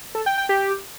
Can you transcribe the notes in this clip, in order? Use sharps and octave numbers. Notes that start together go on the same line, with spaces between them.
A4
G5
G5
G4